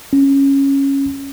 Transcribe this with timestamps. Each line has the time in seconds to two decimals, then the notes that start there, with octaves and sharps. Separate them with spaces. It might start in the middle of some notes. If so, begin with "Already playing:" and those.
0.13 C#4